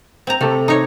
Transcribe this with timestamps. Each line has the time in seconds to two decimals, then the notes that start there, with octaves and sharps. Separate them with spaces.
0.27 C4 A#5
0.41 C3 A3 A4
0.68 D#4 C#5 A#5